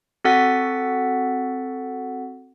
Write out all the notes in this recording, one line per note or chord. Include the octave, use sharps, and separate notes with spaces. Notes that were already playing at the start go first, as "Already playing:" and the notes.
C4 F#4 A4 F#5 A6 B6